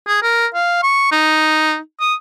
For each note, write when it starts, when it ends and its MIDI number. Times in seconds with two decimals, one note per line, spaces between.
0.07 0.18 68
0.22 0.47 70
0.54 0.82 77
0.83 1.10 85
1.12 1.77 63
2.00 2.15 87